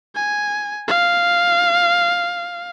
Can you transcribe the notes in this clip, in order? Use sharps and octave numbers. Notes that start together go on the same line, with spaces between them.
G#5
F5